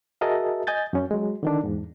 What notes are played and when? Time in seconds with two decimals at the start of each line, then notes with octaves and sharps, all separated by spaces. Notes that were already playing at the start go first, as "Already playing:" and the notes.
0.21 F#4 G#4 A#4 D#5 E5 A5
0.67 D#5 G#5 G6 A6
0.93 F#2 C#4
1.11 F#3 G#3
1.43 D3 D#3 D4
1.64 E2 G#2